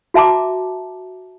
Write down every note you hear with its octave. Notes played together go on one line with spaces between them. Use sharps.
F#4 E5 A5 A#5 D6